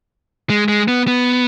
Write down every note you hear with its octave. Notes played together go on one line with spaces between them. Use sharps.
G#3
G#3
B3
B3